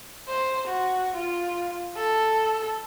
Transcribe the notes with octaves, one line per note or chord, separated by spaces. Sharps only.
C5
F#4
F4
A4